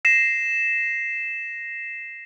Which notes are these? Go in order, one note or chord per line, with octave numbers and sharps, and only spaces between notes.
A#6 C7 E7